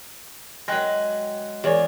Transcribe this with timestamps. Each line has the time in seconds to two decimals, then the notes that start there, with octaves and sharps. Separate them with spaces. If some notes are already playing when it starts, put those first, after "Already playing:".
0.68 F#3 G#3 G5 F#6 A#6
1.64 E2 G#4 C#5 D5